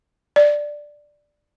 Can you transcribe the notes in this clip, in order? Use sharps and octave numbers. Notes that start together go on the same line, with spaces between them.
D5